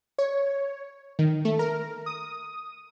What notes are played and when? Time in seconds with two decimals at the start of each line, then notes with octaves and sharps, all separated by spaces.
0.18 C#5
1.19 D#3
1.45 A3
1.59 A#4
2.06 D#6